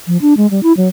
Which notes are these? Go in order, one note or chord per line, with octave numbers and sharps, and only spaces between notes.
F3
D4
G#3
G3
E4
F#3